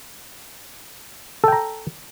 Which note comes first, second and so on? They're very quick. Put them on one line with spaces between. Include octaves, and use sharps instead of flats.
A4 G5 A#5